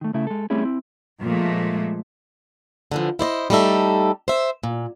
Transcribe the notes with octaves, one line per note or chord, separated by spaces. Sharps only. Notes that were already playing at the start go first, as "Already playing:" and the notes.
D#3 A3
C#3 A3 E4
G#3 A4
G3 A3 C4 C#4 E4 G#4
C4 E4
A#2 F3 G#3 A3
D3 E3 F3
E4 C5 D5 D#5
G3 A3 D#4 A4 E5
C5 E5
A#2